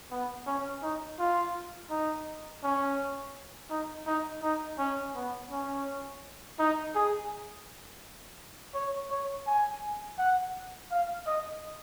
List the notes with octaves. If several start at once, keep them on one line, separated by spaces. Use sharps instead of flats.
B3
C#4
D#4
F4
D#4
C#4
D#4
D#4
D#4
C#4
B3
C#4
D#4
G#4
C#5
C#5
G#5
F#5
F5
D#5